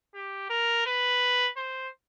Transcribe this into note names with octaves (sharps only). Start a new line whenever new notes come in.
G4
A#4
B4
C5